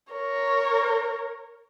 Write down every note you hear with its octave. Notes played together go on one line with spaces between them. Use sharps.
A#4 C#5